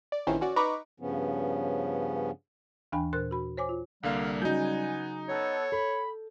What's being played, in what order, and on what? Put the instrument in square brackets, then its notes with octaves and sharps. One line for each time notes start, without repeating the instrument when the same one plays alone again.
[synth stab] D5
A#1 D#3 E3 C#4 C5
C#4 F#4 D5
D#4 B4 A#5 B5 C#6 D6
[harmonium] G2 C#3 F3 B3 C#4
[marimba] D#2 E3 D4 G5 G#5 B5
A#2 A#4 C5 F#6
F#4 B5
C5 C#5 G#5 D6
F4
[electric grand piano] C2 D3 A#3 [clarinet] G3 [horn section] F5
[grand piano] C#3 F#3 [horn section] B3 G#5 [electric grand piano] D#4 G6
[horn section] B3 A4 [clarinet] C#5
[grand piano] A4 [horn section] B5